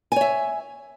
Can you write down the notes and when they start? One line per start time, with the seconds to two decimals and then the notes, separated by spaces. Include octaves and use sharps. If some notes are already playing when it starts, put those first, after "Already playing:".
0.12 G#5
0.16 C#5
0.21 E5